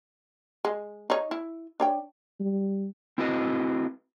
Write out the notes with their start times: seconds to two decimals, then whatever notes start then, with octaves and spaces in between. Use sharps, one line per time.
0.65 G#3
1.10 D#4 C#5
1.31 E4
1.80 D4 C#5 G5
2.40 G3
3.18 C4 E4 F#4 B4 D#5